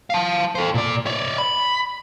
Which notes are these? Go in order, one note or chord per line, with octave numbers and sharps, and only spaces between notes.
F5 A5
A4 C5
A#2 D5
C#5 D5
B5